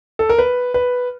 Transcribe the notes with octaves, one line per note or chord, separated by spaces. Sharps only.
A4
A#4
B4
B4